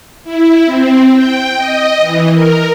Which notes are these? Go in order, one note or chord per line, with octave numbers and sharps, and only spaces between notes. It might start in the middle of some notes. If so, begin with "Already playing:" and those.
E4
C4
G5
D#5
E3
A#4